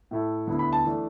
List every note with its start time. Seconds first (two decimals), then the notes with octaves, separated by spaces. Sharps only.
0.11 A2 A3 E4
0.47 D2 D3 B3 E4
0.59 B5
0.73 A5
0.85 E3 A3 D4